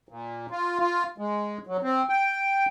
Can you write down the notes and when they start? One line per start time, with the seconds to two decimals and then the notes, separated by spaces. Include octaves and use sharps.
0.09 A#2
0.51 F4
0.79 F4
1.18 G#3
1.67 F#3
1.82 C4
2.09 G5